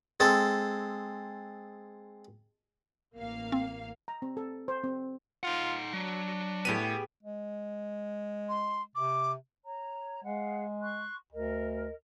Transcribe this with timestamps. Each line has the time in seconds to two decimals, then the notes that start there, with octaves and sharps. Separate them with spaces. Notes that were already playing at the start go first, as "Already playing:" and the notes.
0.20 G#3 C4 A4
3.15 A1 A#3 F5
3.52 C4
4.08 A#5
4.22 C4
4.37 A4
4.68 C5
4.84 C4
5.43 D#4 F4 F#5
5.93 F#3 D4
6.65 A2 B3 G4 G#4 D#7
7.23 G#3
8.49 C6
8.95 C3 D6
9.65 C#5 A#5
10.24 G#3 G#4 F5 F#5
10.81 C6 C#6 F#6
11.32 D2 A#4 D#5